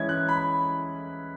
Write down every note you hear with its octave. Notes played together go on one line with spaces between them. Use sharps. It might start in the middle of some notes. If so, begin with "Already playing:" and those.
Already playing: E3 G#3 C#4 E4 G#6
F#6
B5